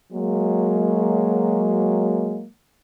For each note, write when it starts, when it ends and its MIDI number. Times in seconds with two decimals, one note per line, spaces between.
0.12 2.46 54
0.12 2.46 56
0.12 2.46 58